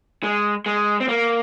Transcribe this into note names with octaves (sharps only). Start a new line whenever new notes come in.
G#3
G#3
C4
A#3